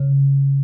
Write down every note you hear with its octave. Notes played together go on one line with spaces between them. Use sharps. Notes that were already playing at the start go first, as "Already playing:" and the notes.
Already playing: C#3